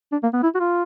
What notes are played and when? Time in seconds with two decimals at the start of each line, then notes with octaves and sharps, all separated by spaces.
0.12 D4
0.23 A#3
0.33 B3
0.43 E4
0.55 F#4
0.59 F4